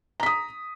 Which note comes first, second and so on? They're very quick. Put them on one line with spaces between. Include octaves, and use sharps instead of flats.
A#5 B6 D#6